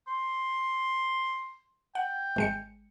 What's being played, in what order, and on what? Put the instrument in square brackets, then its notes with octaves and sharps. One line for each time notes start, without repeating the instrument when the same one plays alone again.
[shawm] C6
[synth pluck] F#5 [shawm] G5
[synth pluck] G#1 G#3 C#7